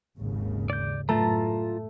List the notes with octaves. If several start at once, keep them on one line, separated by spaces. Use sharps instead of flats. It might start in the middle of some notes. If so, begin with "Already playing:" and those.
G#1 D#2 C#3
D5 G6
F#2 A2 A3 F4 A5 A#5